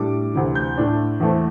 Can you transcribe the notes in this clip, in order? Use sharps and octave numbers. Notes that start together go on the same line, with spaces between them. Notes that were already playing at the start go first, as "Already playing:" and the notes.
Already playing: A2 G3 D4 D6
D2 C3 E3
G6
A2 A3 D4
E2 E3 A3 C4